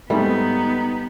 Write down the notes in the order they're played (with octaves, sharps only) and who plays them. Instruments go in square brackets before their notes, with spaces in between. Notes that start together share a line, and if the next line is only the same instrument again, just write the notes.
[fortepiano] G#2 A3 [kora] G3 [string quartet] B3 [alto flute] D#4